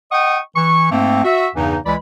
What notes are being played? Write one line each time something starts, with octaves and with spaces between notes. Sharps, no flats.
D#5 F#5 G5 C#6 D#6
E3 C#6
G#2 A3 A#3 C4
F#4 E5
E2 G2 C#3 E3 D#4
C#2 E3 G#3 D5 B5